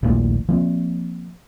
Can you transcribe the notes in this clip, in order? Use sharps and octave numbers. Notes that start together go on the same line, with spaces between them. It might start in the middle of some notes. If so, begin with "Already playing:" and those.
D#1 A#1 A2 A#3
F3 A#3 C4